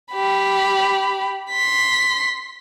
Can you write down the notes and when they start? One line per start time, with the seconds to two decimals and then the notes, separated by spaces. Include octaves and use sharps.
0.13 G4 B5
1.51 C6 B6